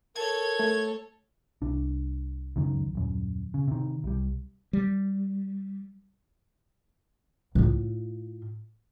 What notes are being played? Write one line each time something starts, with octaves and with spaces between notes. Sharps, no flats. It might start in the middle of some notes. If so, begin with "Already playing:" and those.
A4 A#4 C#5 G#6
A3
C2 D4
C#2 F#2 D#3
D#1 F#2
C#3
C3 D#3
C2 G3
G3
A2 F4